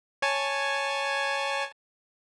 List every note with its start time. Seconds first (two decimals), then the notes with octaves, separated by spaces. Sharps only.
0.22 C#5 G#5 A5